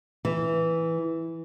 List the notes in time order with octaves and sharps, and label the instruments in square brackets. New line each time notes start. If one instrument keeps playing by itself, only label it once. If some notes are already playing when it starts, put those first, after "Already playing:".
[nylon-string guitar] E3